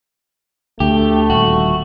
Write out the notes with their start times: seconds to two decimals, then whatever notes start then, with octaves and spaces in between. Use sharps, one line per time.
0.80 D2 A3 G4
1.30 D#1 F#4